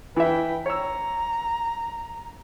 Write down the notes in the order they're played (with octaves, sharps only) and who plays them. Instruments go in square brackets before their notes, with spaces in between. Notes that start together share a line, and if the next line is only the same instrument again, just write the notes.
[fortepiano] E3 E5 [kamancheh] B4 G5
[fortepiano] C#5 E6 [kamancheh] A#5